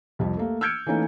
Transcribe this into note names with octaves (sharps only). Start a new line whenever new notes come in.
C2 F2 G3
A3 A#3
E6 F6 G6 G#6 C#7 D7
E3 A3 A#3 C#4 D#4